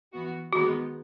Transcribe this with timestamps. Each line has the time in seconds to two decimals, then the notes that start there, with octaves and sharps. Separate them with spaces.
0.13 E3 B3 F#4
0.53 D#3 G#3 B3 D#4 F#4